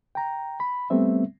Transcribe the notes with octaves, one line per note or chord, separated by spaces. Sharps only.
G5 A#5
B5
G3 A3 B3 C4 E5